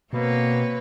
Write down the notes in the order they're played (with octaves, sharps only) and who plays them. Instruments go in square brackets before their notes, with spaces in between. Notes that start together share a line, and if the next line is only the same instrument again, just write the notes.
[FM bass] B2 [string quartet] A#3 [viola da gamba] C4 B4 C#5